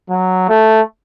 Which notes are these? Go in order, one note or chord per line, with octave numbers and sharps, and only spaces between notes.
F#3
A3